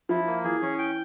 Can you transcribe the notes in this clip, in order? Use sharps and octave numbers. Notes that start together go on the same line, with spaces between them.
F3 E4
A#3
E3 G#4
E3 C#4
G5